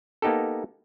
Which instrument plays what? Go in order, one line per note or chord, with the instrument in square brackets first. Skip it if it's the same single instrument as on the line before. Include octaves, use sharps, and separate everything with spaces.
[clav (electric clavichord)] A#3 B3 D#4 G4 A4